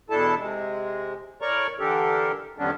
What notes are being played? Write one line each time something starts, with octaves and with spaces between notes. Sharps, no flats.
E2 B2 D4 E4 A4 A5
C3 G#3
A2 A#4 C#5 D5 A#5 C#6
D3 E3 D4 G4 A4 A#4
F2 D#3 G3 B3 C#4 D4